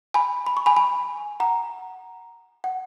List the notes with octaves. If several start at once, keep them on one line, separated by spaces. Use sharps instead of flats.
G#5 B5
B5
C#6
G#5 B5
G#5 B5
F#5 A#5
F#5